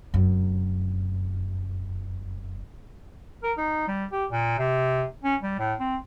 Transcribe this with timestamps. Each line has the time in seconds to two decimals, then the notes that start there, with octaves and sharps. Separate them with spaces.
0.14 F1 F#2
3.43 A#4
3.58 D#4
3.88 G3
4.12 G4
4.30 A#2
4.59 C3
5.24 C#4
5.43 G3
5.59 A2
5.80 C4